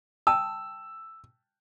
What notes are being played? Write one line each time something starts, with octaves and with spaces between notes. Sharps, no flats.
G5 A5 D#6 E6